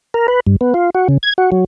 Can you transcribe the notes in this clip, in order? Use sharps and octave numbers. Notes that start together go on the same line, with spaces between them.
A#4
B4
G2
B3
F4
F#4
C#3
G#6
F#4
F#3